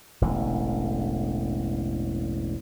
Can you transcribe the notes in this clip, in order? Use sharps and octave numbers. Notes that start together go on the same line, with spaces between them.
E1 A1 D3